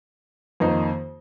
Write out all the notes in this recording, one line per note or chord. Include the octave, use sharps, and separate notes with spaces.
F2 D#3 A#3 D#4